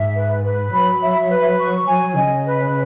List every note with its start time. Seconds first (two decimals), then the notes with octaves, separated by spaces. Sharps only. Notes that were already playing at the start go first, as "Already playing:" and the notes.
Already playing: G#2 E5
0.16 B4
0.44 B4
0.72 F#3 B5
1.02 E5
1.30 B4
1.59 C#6
1.88 F#3 G#5
2.16 C#3 D#5
2.45 B4